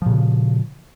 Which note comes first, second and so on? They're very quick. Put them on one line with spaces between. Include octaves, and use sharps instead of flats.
F3 A#2 C#3